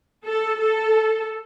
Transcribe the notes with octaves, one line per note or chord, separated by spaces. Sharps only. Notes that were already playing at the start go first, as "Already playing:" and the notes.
A4
A4